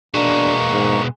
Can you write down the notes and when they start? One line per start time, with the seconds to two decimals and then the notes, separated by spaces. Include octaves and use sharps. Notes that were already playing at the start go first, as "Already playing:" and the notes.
0.14 B2 G#3 A#3 D4 C#6
0.73 G#2